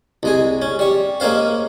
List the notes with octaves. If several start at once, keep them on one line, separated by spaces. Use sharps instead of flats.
C2 G#3 G#4
C#4
G3 C#6
G#3 A#3 C#4 C5 F5